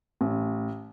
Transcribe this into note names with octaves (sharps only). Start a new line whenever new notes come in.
A1